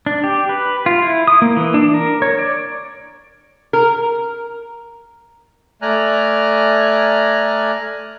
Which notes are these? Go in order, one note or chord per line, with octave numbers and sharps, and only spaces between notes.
D4
G4
B4
F4
E4
D#6
A#3
E3
D4
A#4
C#5
D5
A#4
A3 D5 G#5 A#5 F6 F#6